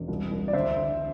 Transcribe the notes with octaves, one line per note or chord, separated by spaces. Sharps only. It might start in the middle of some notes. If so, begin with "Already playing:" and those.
Already playing: E1
C2
C2
D5
D2 C5 E5
D2